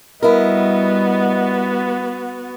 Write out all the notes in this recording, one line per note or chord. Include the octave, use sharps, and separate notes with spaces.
G3 B3 E4 F#4 A#4 D#5